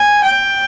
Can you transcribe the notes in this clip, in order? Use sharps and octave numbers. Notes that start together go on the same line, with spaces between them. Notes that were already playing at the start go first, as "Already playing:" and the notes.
Already playing: G#5
G5